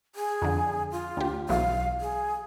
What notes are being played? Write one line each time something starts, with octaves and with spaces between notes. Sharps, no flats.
G#4
F2 D3
F4
D2 G4
B1 E3 F#3 F5
G#4